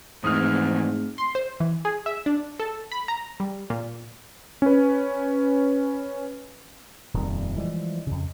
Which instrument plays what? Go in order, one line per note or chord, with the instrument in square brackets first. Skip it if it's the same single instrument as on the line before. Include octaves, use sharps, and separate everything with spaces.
[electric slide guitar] F2 E3 [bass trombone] G#2 [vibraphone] A3 C4 [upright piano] D#6 F6
[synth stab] C6
C5
E3
G#4
E5
D4
A4
B5
A#5
G3
A#2
[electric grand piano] C#4 B4
[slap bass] D#1 F2 D#3 G3
E3 F3 G3 G#3
F2 C#3